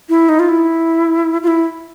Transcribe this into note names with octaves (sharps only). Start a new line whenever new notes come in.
E4
D#4
F4
E4
F4
E4